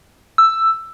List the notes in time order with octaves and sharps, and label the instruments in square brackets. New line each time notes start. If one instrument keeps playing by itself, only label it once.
[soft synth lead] E6